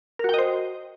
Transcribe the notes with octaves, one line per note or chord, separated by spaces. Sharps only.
F#4 A#4 C5 D#5 G5